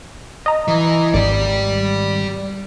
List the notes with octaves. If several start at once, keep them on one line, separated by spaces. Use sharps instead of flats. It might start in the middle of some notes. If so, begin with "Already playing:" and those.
D#5 A#5
E3
G#1 G4 D5